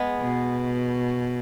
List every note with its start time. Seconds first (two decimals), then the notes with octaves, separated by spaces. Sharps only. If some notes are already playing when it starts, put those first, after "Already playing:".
Already playing: G#3 B3
0.20 B2